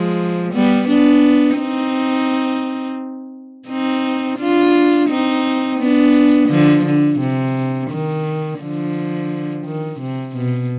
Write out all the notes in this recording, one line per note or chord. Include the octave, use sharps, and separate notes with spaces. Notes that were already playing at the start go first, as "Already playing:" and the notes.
Already playing: F3 G#3
G3 B3
B3 D4
C4 D#4
C4 D#4
D4 F4
C4 D#4
B3 D4
D3 F3
D3
C3
D#3
D3 F3
D#3
C3
B2